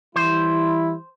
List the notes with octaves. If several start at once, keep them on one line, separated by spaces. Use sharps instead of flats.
E3 G3 E4 C5